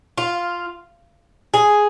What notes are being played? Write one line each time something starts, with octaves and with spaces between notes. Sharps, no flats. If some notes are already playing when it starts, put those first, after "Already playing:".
F4
G#4